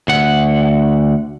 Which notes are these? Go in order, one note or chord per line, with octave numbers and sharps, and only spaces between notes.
D2 F#5